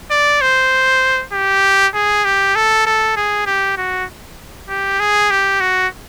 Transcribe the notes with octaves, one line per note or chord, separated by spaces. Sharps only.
D5
C5
G4
G#4
G4
A4
A4
G#4
G4
F#4
G4
G#4
G4
F#4